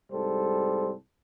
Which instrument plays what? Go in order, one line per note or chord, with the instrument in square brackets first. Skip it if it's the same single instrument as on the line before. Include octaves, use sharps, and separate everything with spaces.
[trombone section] C2 G#2 G3 A4 C5